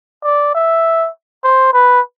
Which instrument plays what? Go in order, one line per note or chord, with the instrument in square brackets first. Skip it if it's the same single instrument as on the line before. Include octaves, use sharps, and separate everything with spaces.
[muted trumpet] D5
E5
C5
B4